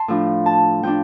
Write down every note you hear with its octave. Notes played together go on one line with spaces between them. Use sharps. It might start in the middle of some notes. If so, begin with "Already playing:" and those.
Already playing: A5 C6
A2 F3 D4
A5
F3 D4 G5